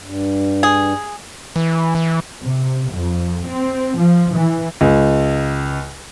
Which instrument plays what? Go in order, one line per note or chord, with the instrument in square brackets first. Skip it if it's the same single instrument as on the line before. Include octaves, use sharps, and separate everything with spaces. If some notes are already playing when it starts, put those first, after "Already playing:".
[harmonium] G2
[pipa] G#4
[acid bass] E3
E3
[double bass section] C3
F2
C4
F3
E3
[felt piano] C#2